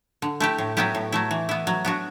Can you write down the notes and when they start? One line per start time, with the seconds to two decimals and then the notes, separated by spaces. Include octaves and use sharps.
0.22 D3
0.40 A3 E4 G4
0.58 A2
0.77 F#3 B3 E4 G4
0.95 A2
1.12 F#3 A3 E4
1.31 E3
1.49 B3 E4
1.67 F#3
1.85 B3 D4 F#4